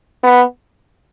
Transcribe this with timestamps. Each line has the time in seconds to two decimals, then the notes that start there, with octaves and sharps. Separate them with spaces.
0.23 B3